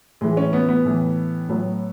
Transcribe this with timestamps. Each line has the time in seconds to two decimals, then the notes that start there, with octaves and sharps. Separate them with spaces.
0.21 A2 E3 G#3
0.37 C#4
0.53 B3
0.69 B3
0.85 A2 E3
1.49 A2 F#3